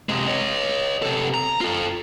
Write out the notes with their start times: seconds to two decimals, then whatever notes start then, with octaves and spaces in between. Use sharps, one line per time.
0.09 C3 G#3
0.27 C#5 D#5
1.03 C3 A4
1.34 A#5
1.61 F4 A4